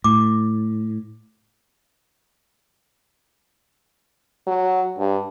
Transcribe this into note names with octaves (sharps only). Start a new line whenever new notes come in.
A2 D6
F#3
G2